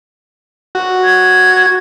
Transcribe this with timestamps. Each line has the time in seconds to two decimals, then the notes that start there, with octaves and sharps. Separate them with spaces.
0.75 F#4
1.04 G#6